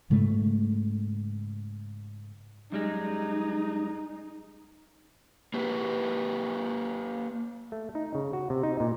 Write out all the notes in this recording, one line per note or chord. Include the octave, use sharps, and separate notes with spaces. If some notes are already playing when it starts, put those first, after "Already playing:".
G#2 C#3 G#3 A3
F#2 G3 G#3 D#4
A#3 G4 B4
A3
D#4
C#3
F#4
C3
D#4
A#2